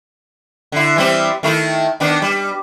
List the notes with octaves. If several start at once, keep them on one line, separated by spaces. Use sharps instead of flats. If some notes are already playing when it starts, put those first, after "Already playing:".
D3 E4
E3 G3 C4
D#3 A3 E4
D#3 B3 D4
G3